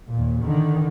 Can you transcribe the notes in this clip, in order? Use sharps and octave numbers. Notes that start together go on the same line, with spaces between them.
D#2 A#2
D3 D#3